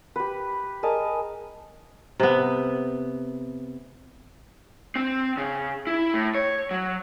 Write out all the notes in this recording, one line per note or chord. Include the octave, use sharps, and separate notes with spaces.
G4 B4
G#4 A#4 D#5 A5
C3 B3
C4
C#3
E4
A2
C#5
F#3